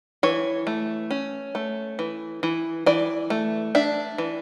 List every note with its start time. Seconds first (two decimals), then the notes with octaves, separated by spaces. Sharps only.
0.23 E3 C#5
0.67 A3
1.10 C#4
1.55 A3
1.99 E3
2.43 E3
2.86 E3 D5
3.30 A3
3.75 D4 E5
4.18 E3